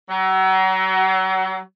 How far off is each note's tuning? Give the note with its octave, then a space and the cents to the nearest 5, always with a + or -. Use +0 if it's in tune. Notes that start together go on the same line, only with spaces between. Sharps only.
F#3 +35